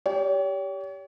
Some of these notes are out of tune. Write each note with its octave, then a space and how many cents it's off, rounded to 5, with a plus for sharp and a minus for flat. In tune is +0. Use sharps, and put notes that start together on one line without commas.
G4 +0 C#5 +40